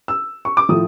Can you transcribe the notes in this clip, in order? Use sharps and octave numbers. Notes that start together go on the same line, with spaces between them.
E6
C#6
D6
A2 F3 D#6